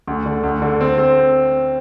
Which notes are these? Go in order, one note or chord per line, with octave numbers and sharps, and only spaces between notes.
D2
D3
D2
D3
C4
C4